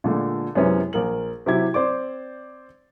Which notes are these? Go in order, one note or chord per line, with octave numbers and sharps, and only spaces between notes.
A#2 D3 G#3 A3
F#2 C3 G#3 B3 C#4 E4
A#1 A#4 F#7
C3 F#3 E4 G4 G#6
C4 C5 D5 D6